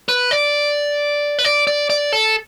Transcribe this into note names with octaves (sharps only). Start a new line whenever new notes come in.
B4
D5
B4
D5
D5
D5
A4